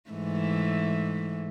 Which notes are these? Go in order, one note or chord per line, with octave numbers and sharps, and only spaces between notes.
G#2 E3 A3